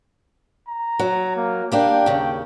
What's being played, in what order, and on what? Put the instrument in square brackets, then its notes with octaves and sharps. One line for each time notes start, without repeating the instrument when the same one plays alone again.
[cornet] A#5
[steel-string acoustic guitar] F#3
[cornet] A#3
[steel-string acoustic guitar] G3 A#3 D4 [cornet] G5
[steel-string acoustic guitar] D#2 C#3